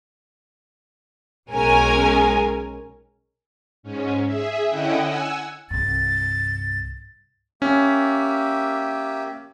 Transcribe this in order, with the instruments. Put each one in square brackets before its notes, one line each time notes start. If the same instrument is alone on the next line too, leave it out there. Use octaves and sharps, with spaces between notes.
[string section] B1 G#3 C#4 A#4 G#5
[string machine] G#2 C#4
G#4 E5
D3 C#4 E4 D#5 F#5 G5
F#5 G#5 E6
[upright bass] C2 G2 [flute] A6
[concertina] A#3 G4 E5 [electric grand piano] C#4